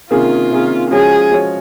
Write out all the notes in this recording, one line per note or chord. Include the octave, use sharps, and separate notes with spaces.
C3 D#3 A#3 C#4 F4 G#4
C3 D#3 A#3 C#4 G#4
F3 G#3 C#4 F#4 G#4 C#5
F3 G#3 C#4 F#4 C#5